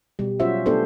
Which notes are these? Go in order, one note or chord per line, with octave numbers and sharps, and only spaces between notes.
B2 G3
F#3 C#4 F4 F#4 C5 E5
A3 B3 D4 G4 A4 C5